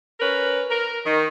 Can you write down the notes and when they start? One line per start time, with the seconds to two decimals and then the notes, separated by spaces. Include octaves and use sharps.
0.20 C#4 A#4 B4
0.70 A#4
1.06 D#3